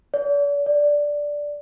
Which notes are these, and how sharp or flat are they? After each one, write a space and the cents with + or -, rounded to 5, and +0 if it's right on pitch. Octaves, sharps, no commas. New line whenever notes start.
D5 -45
D5 -5